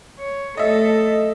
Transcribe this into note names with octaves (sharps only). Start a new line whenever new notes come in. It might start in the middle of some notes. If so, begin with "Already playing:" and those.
C#5
A3 A4 D#5 E5